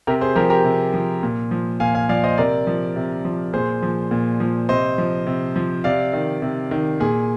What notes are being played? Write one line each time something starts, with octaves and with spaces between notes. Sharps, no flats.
C3 G4 A#4
G#4 C5
F3 G4 A#4
G4 A#4
C3
F3
A#2
F3
A#2 F5 G#5
F5 G#5
F3 D5 F5
C5 D#5
C3 A#4 D5
F3
C3
F3
A#2 G#4 C5
F3
A#2
F3
C3 C5 D#5
F3
C3
F3
C3 D5 F5
D#3
C3
D#3
A#2 G#4